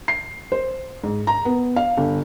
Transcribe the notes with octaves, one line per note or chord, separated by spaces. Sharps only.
C7
C5
G#2
A#5
B3
F5
G1